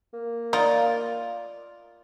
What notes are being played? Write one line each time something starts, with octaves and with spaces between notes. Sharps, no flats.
A#3
D#4 F4 D5